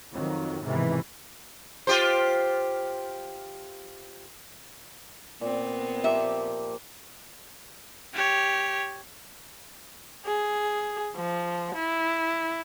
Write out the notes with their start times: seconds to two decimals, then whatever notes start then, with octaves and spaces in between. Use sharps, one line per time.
0.14 F2 D#3 F#3
0.63 B1 G#2 C3 D#3 E3
1.87 F4 G4 C5
5.41 A#2 B3 C4
6.04 F3 A#3 G4 E5
8.14 G4 C#5
10.26 G#4
11.16 F3
11.75 E4